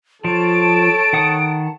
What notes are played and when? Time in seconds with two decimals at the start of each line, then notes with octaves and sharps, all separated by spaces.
0.25 F3 A4 C#5 A5 D7
1.13 D#3 F#5 D#6